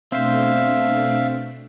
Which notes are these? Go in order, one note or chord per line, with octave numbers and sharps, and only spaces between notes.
B2 A3 C4 D4 C5 E5 F5